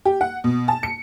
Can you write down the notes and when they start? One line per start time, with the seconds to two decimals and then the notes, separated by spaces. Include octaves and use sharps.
0.05 G4
0.21 F#5
0.44 B2
0.68 A5
0.83 C#7